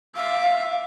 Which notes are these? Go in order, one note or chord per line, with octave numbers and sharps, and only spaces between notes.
E5 F5 D6